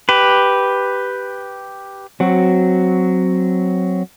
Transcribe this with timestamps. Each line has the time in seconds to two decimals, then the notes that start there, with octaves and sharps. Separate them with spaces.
0.09 G4 B4
2.20 F#3 C4 F#4